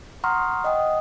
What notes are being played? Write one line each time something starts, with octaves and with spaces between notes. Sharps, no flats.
F#5 A#5 C6 C#6 D#6 F6
D#5 F#5 G5 D#6